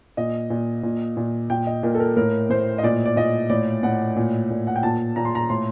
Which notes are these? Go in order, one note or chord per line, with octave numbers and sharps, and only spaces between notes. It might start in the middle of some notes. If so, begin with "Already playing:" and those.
A#2 D#5
A#2
A#2
A#2
A#2 G5
D#5
A#2 A#4
A4
A#4
A2 A#4
A2 C5
D#5
A#2 D5
D5
A#2 D#5
A2 D5
A2 F#5
A#2
A#2
F#5
G5
A#2 A5
A#2 A#5
C6
A#5
A2 C6